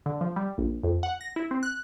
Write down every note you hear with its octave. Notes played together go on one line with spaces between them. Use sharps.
D3
F3
G3
A#1
F2
F#5
A#6
E4
C4
F#6